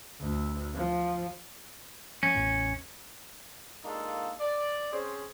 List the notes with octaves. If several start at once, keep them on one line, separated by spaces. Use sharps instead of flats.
D2
F3
F3 C#4
A1 E2 A2
G#3 A#3 D4 D#4 F4 A4
D5
C4 C#4 G#4 C5